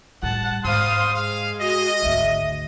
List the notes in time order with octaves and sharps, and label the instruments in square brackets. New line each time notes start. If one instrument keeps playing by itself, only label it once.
[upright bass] A2 G3 [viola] F#5 A5
[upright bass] G#2 [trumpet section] G3 C6 D#6 [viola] C5 F5
[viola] G#3 [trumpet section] F5
[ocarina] F#4 [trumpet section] D#5
[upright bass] G#1 D2 [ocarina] E5